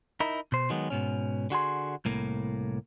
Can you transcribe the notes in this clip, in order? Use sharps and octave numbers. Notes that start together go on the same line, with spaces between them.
D#4 E4 A#4
B2 C5
D#3 F#3 G#3 B3
G#2 B2 C#4
D3 F#4 G#4 C6
C2 A2 A#3